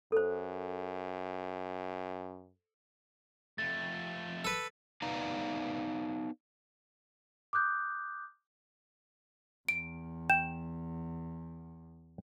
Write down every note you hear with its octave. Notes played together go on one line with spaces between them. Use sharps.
F#2 A4 C5
F2 A3 A6
A4 B4
B3 D#4 B4 D5 F5 A#5
D6 D#6 F#6 G6
E2 D7
G5 E7